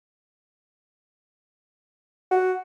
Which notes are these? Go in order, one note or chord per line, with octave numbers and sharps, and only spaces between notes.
F#4